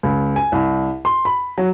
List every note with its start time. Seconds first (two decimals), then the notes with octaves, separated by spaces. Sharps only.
0.03 C#2
0.36 G#5
0.52 C2
1.05 C6
1.25 B5
1.58 F#3